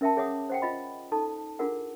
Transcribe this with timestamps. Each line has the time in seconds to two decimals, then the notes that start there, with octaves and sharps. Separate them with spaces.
0.01 C#4 A#4 E5 G5 A5
0.17 G#4 C#5 E5 F#5 D6 D#6
0.49 C5 F#5 G5
0.62 F4 D#5 B5
1.12 D#4 A4 A5
1.59 D4 F4 G#4 A#4 F#5